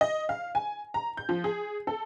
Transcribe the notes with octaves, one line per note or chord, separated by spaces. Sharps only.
D#5
F5
G#5
A#5
G6
F3
G#4
A4